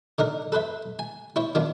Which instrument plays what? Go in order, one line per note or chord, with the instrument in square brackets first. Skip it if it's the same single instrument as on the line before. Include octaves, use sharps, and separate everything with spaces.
[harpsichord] D3 D#4 A#4
A4 B4 C5 E5
G#5
E4 C5 C#5
D#3 B3 D4 F4